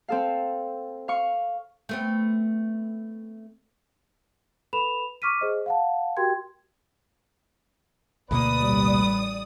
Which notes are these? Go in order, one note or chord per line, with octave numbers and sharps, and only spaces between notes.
C4 A4 F5
F5 C#6
A3 B3 C4
A4 B4 B5 E7 F7
C#6 D6 F6 B6 D#7
G#4 C5 D#5
F5 F#5 A5
F#4 G4 A#4 G5 C6 G#6
D2 B2 A#3 B4 D5 D#6
A1 G3